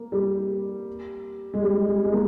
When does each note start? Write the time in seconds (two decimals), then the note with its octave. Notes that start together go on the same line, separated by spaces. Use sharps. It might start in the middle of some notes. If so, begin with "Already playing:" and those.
Already playing: A#3
0.12 G3
1.54 G#3
1.63 G3
1.88 G3
2.04 G#3
2.13 A#3